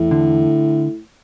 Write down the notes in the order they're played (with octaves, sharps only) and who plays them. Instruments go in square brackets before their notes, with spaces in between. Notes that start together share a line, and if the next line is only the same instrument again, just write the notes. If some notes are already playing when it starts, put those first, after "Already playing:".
Already playing: [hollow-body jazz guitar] E2 [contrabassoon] A2
[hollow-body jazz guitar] D3